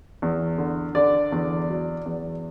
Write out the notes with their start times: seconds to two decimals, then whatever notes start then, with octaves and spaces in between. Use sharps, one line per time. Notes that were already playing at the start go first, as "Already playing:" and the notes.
0.22 E2
0.58 D3
0.95 D3 D5
1.32 E2
1.69 F#3
2.06 E2